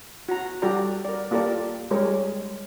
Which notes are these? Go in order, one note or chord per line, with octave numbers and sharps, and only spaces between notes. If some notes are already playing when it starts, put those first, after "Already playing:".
F#4 A#5
G3 F#4 G4 A4 D5 A#5
A#4 D5
A#3 F4 G4 A4 A#4 D5
G3 G#3 G4 A#4 C#5